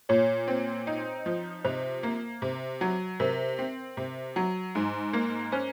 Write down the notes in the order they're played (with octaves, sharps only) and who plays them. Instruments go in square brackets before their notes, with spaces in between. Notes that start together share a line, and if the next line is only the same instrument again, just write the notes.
[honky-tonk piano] A#2 [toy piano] C#5
[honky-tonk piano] C4
D#4
F3
[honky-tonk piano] C3 [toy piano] C5
[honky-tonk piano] A#3
C3
F#3
[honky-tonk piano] C3 [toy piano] A#4
[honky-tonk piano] C4
C3
F#3
G#2
A#3
[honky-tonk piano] C#4 [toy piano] C5